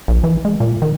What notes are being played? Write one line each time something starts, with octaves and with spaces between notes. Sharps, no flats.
A#1
E3
G#3
A#2
D#3